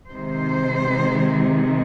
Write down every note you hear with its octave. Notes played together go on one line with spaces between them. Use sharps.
C3 D#3 G#3 C5